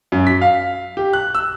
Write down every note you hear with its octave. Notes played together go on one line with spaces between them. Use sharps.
F#2
B6
F5
G4
F#6
E6